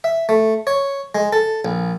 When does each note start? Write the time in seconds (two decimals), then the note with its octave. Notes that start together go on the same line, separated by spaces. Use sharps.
0.04 E5
0.29 A3
0.67 C#5
1.15 G#3
1.33 A4
1.65 A#1